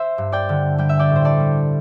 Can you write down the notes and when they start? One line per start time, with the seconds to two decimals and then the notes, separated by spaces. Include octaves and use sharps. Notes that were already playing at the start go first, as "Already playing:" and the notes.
Already playing: C5 E5
0.18 G2
0.32 D5 G5
0.49 D3
0.78 G3 G5
0.89 E5
0.99 D5 G5
1.10 A2
1.16 C5
1.24 A4 D5
1.40 G3